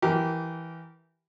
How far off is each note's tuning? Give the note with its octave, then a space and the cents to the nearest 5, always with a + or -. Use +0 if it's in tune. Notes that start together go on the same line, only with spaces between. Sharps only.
E3 +0 G4 -20 A#4 +0